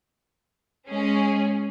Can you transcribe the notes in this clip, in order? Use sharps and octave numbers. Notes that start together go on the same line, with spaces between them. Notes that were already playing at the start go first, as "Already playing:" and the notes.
G#3 C#4 G#4